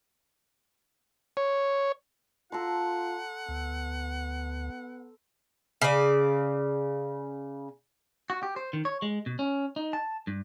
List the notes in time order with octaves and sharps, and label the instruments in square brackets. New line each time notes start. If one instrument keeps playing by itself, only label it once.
[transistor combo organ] C#5
[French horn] F4 [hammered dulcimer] A4 A#5 C6 [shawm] F#5
[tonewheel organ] D2 [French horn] B3
[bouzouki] C#3 D5
[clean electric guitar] F#4
G4
C5
D#3
C#5
G#3
B2
C#4
D#4
A5
G2